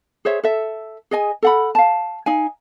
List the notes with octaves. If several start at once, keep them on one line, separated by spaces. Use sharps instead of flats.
G#4 C5 C#5 E5
A4 E5
G#4 D#5 G#5
A4 F#5 B5
F5 A5
D#4 F5 G#5